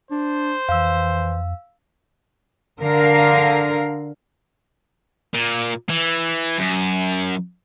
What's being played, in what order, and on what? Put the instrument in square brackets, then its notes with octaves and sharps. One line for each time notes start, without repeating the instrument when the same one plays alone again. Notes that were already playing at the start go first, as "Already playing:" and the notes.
[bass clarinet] D4 [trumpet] C5
[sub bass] F2 [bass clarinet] E3 [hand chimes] F5 E6
[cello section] D3 A#4 F5
[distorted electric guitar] A#2
E3
F#2